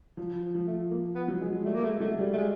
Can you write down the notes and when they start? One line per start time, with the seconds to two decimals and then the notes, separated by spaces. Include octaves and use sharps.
0.17 F3 F#3
0.42 F3
0.55 F3
0.67 A3
0.91 F3 A#3
1.15 B3
1.28 F#3
1.40 G#3
1.53 G#3
1.64 G3 A3
1.74 A#3
1.82 G#3 A3
2.00 F#3 A3
2.19 G3
2.33 A3
2.38 G#3